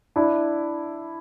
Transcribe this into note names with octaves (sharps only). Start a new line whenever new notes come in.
D4 E4